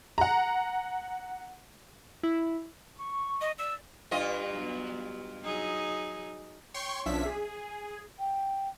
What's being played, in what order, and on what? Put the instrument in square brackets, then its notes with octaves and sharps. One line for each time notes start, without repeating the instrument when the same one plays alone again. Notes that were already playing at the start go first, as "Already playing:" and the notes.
[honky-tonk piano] F#5 A#5
[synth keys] E4
[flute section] C#6
[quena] D#5
[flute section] D5 [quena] E6
[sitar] G2 F4 D#5
[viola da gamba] F#3 B3
F#3 D#4 G#4
[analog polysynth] C#5 G5 C6 C#6
B1 F3 C#4 D4 E5 B6
G#4
[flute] G5